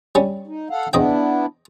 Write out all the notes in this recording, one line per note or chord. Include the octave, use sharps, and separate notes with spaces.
G3 C#4
D#4
A4 F5 F#5
E2 B3 D4 E4 D#5 G5